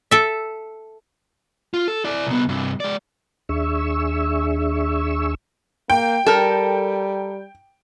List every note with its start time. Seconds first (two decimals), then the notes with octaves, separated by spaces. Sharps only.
0.11 A4 E5
1.74 F4
1.88 A4
2.04 E4 D5
2.27 C2 B3
2.49 G2 C3
2.80 G#3 D5
3.49 D#2 D4 G#4 E5 C#6 E6
5.90 A#3 G5
6.26 G3 A4 A#4